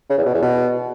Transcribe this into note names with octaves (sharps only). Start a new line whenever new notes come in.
C#3
E2
B2
E2
B2